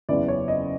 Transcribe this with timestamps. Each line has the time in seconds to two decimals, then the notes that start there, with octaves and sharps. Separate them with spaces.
0.09 F#1 E2 C#3 E3 D5
0.28 C#5
0.48 D#5